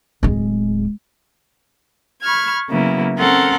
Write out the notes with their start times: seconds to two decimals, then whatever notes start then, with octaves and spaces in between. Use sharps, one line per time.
0.23 D1 G#3
2.23 B5 C#6 F6 G#6
2.69 C#3 F#3 A#3 B3 E4
3.18 C4 C#4 A4 A#4 F#5 C6